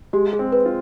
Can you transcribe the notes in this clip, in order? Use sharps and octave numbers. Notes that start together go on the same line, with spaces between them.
G#3 G4
G#4
C4
B4
F4